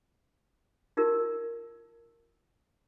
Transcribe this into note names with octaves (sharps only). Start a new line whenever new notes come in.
D#4 F4 G4 A#4